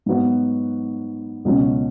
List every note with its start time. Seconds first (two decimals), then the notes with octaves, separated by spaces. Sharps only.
0.06 G#2 F#3 B3 F#4
1.45 C#2 B2 F#3 C#4